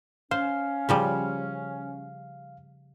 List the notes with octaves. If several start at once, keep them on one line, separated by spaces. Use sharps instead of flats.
C#4 C5 F5
C#3 F3 G3